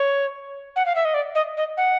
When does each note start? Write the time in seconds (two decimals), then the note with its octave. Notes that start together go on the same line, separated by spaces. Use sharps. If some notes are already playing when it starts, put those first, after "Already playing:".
Already playing: C#5
0.76 F#5
0.86 F5
0.95 E5
1.05 D#5
1.14 D5
1.35 D#5
1.57 D#5
1.77 F#5